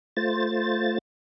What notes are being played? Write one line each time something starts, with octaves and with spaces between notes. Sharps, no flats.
A3 F4 C5 A6